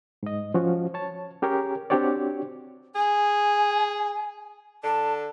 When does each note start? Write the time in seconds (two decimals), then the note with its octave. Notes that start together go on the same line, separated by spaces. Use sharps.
0.23 G#2 D#5
0.54 F3 C#4 F#4
0.94 C#5 A5
1.42 C#4 G4 G#4 A#4 C#5
1.90 C4 D4 F#4 G4 C#5 D5
2.95 G#4 G#5
4.84 D3 A5